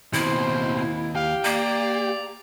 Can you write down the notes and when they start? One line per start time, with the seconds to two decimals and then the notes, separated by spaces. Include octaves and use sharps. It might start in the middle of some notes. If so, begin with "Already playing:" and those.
0.14 D#2 B2 C4 E4 C5
1.15 G4 F5
1.45 A#3 D5 A#5